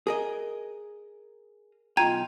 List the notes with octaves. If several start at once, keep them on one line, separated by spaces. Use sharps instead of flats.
G#4 A#4 D#5
B1 F4 G5 A#5 G#6 D#7